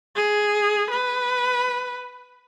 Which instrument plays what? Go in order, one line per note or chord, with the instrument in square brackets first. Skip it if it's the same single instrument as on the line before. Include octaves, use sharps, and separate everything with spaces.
[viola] G#4
B4